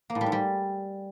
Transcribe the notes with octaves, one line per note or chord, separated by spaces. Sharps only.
A#3
A2
G3
G#2
G3